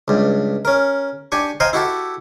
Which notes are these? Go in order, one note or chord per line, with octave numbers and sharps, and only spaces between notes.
C#2 G2
C#4 A#4
D4 G4 G#5 C#6
C5 D#5 F5 G5 G#5 A#5
E4 F#4 G4 A4